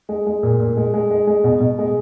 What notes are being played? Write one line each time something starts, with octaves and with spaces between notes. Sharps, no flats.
G#3
G#3
A#2
A#2
G#3
G#3
G#3
G#3
B2
B2
G#3